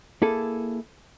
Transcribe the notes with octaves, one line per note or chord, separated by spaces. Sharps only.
A#3 E4 G#4 A4